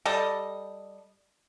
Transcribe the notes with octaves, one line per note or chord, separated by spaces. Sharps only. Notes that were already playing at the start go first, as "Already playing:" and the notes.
G3 A4 D#5